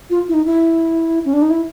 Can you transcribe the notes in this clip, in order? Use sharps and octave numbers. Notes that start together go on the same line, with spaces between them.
F4
E4
D#4
E4
C#4
D4
D#4
E4